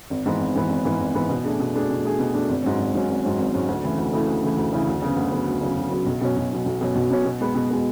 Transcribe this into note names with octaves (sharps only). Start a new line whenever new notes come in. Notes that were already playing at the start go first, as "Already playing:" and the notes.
G#1
G#2 E3 B3
G#1
G#2 E3 B3
G#1
G#2 E3 B3
G#1
G#2 E3 B3
B2
A3 D4 G#4
B2
A3 D4 G#4
B2
A3 D4 G#4
B2
A3 D4 G#4
G#1
G#2 F#3 C#4
G#1
G#2 F#3 C#4
G#1
G#2 F#3 C#4
G#1
G#2 F#3 C#4
D2
C#3 E3 A3 E4
D2
C#3 E3 A3 E4
D2
C#3 E3 A3 E4
D2
C#3 E3 A3 E4
D2
C#3 F#3 B3
D2
C#3 F#3 B3
D2
C#3 F#3 B3
D2
C#3 F#3 B3
B1
B2 F#3 C#4
B1
B2 F#3 C#4
B1
B2 F#3 C#4
B1
B2 F#3 C#4
B2
G#3 B3
B2
G#3 B3